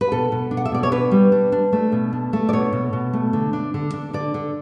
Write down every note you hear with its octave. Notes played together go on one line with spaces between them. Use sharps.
B4
B2 A4
B2
D4
F#5
E5
B2 D5
C#5
D4 B4
G3
D4
D4
A3
B2
D4
A3
D5
B2 C#5
B2
B2
A3
D3
D4
D3
D4
D3 D5
D3